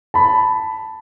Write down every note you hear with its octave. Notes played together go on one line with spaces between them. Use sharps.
A5 B5